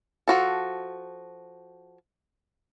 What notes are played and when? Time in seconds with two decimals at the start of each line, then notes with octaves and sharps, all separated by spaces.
0.28 F3 F#4 A4